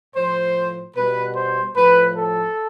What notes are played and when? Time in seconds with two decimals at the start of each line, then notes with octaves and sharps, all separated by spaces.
0.15 A2 F3 C5
0.96 B2 G3 B4
1.36 C5
1.76 A2 F3 B4
2.16 A4